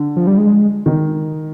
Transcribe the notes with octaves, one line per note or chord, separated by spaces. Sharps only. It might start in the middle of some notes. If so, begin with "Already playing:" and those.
Already playing: D3
F3
G3
G#3
D#3